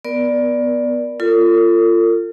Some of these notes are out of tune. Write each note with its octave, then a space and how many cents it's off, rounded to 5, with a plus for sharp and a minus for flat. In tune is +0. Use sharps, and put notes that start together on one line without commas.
B3 +0 A#4 +25 D5 +0
F4 -15 A4 +40